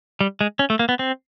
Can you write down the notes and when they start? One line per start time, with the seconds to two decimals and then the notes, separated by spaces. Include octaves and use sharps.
0.21 G3
0.41 G#3
0.59 C#4
0.70 A3
0.79 A#3
0.89 B3
0.99 C4